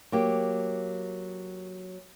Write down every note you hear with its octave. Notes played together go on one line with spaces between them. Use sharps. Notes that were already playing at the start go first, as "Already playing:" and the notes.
F#3 A#3 G4